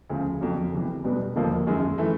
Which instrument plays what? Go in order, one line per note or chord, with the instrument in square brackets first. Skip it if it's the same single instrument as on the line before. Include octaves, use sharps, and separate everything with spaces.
[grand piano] D2 C#3 F3
F2 D3 F#3
E2 C3 E3
B1 B2 G3 B3 D4
E1 D#2 D3 F3 A#3
F#2 D#3 G#3
E3 A3